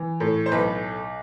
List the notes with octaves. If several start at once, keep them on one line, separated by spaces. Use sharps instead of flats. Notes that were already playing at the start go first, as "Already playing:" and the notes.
Already playing: E3
A2
C5
B1 B4